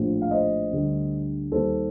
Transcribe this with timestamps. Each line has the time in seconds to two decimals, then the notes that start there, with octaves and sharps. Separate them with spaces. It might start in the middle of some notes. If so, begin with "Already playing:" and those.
Already playing: A#1 A2 F3
0.22 F5
0.31 C5 D#5
0.72 D2 D3 G3
1.51 D#2 D#3 G3 A4 C5